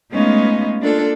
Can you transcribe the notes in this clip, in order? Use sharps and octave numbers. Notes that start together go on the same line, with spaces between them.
G#3 A3 B3 C#4 D#4 F4
A#3 D4 F4 A4